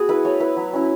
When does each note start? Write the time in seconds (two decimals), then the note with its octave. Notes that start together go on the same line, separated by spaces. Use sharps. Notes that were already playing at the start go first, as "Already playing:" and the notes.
Already playing: B3 F#4 G#4
0.09 E4 B4
0.25 A3 C#5
0.40 E4 B4
0.57 F#3
0.73 C#4 E4